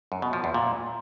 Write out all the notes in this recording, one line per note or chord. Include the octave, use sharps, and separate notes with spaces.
F#2
B2
F3
E2
A#2